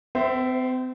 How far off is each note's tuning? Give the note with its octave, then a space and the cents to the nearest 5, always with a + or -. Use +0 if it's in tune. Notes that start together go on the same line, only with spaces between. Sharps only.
C4 -40 C5 +0 E5 +0